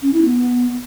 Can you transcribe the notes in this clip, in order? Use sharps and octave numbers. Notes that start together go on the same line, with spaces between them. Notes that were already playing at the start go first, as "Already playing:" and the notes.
C#4
E4
B3